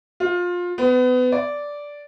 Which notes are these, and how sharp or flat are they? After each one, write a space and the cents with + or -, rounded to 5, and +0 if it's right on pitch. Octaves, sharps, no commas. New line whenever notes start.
F4 +20
B3 +30
D5 -10